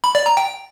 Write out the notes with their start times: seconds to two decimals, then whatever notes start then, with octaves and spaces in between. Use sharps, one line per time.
0.04 B5
0.15 D5
0.26 A#5
0.37 G5